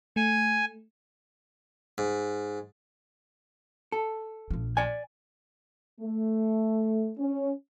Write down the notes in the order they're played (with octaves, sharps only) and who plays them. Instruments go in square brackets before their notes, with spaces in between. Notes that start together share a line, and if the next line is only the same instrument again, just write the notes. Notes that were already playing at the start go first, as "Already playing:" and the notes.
[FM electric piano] A3 [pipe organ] G#5
[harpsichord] G#2
[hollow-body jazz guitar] A4
[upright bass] A#1 F3
[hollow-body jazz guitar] D5 G#5
[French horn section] A3
C#4